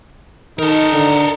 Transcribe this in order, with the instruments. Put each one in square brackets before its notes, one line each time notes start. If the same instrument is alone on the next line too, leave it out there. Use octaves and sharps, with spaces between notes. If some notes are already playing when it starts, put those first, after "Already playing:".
[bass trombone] D#3 [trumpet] D#4 [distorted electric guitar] A4 A#4
[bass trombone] D3